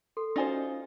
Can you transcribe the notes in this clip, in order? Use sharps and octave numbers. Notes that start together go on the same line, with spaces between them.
A4 C6
C#4 D#4 F4 F#4 C5 D5 G#5